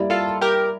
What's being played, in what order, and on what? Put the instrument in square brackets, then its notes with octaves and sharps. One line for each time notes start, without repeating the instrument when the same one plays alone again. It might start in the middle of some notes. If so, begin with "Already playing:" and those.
Already playing: [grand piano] G3 A#3 E4 G4 D5
[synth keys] F4 A4
G4 A#4